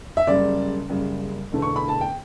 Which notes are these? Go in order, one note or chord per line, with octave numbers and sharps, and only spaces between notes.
E5
F#1 F#2 C#3 G3 D5
F#1 F#2 C#3 G3
E1 E2 D3 A3
C#6
B5
A5
G5